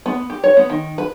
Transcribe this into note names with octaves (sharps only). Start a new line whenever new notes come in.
B3
G4
C#5
B3
D#3
B4